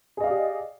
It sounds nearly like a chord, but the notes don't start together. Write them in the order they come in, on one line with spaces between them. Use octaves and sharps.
G#4 D#5 F5 D5 G4